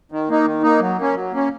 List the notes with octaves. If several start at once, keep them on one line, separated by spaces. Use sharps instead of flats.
D#3
A#3 D#4
D#3
A#3 D#4
F#3
A#3 C#4
F#3
A#3 C#4